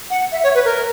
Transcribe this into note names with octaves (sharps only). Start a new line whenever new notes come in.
F#5
E5
C#5
B4
A#4